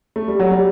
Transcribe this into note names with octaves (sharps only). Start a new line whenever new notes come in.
A3
G3
F#3
G3